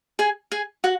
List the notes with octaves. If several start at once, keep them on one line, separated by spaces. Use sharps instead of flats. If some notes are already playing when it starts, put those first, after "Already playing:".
G#4 G#5
G#4 G#5
F#4 F#5